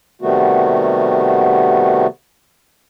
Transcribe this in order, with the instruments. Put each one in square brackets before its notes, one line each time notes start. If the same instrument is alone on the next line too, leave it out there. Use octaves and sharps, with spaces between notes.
[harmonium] C3 D#3 G3 A3 B3 F#4